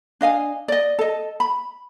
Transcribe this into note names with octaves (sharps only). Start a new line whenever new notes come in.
D4 D#5 F5 G#5
D5 D#5
A4 D#5
B5